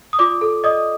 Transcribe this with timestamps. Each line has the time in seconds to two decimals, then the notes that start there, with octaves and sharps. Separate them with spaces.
0.13 D#6
0.19 F4 D5 D6
0.41 A4
0.64 D5 D#5 D#6